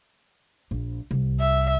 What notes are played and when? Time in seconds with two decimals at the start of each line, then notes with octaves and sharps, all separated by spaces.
0.71 A#1
1.11 C2
1.40 E5